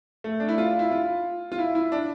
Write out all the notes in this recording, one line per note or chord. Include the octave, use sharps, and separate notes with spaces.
A3
D4
E4
F4
E4
F4
F4
E4
E4
D4